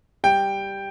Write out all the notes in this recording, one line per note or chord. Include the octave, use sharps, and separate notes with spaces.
G3 G5